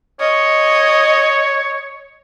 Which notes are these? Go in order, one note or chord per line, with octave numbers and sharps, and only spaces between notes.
C#5 D#5